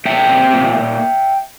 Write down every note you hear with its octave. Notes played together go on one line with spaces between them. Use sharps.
A#2 E5 G5
C4
A#2
A#2